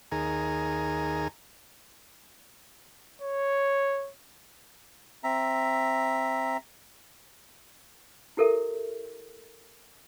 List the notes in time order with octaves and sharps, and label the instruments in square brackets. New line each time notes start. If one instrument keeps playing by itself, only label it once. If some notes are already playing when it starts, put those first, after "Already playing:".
[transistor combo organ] D#2 G#4 A#4
[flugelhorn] C#5
[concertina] C4 E5 A#5
[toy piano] E4 G4 A4 A#4 E5